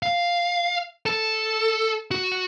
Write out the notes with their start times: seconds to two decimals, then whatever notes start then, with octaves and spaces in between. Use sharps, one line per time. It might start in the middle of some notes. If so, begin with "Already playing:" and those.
0.03 F5
1.06 A4
2.11 F#4